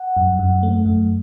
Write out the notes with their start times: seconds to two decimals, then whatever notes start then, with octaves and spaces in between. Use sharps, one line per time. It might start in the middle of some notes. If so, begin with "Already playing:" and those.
Already playing: F#5
0.17 F#2
0.39 F#2
0.63 A3
0.85 F#2